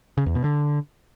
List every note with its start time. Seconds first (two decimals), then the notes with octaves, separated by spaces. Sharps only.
0.17 C#3
0.26 E2
0.35 B2
0.44 D3